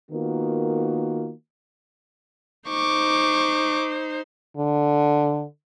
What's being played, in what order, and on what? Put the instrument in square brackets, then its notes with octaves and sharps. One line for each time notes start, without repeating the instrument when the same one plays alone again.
[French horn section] D#3 A#3 B3 F4 F#4 A#4
[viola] D#4 C5 [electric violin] C#6 D6
[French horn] D3